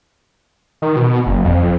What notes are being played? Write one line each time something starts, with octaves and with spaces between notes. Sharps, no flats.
D#3
B2
F#1
F2
F2